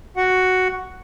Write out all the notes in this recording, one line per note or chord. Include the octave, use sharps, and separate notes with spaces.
F#4 F#5